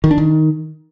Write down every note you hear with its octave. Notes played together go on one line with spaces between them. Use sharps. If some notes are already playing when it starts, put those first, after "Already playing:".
D#3
D4
D#3